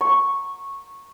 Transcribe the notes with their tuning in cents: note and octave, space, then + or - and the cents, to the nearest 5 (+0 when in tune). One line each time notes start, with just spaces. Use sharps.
C#6 -10